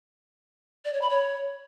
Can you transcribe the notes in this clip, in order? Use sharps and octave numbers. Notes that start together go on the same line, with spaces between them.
D5
C#5
B5
C#5